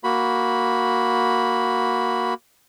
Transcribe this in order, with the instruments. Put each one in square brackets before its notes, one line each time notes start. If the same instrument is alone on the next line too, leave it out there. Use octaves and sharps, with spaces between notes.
[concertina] A#3 F#4 B5